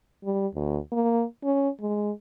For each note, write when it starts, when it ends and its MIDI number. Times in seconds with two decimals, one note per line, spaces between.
0.24 0.47 55
0.55 0.78 38
0.92 1.24 58
1.44 1.69 61
1.81 2.11 56